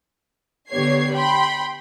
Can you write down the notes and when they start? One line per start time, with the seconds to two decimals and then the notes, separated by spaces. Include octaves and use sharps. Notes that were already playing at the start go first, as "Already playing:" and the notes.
0.70 D3 B3 G4 C#5 G#6 C7
1.14 G5 B5 C6